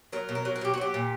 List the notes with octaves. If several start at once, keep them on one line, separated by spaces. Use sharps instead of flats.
F#3 A#4
B2
A#4
F#3
A#4
B2 G4
F#4
F#3 G4
A#2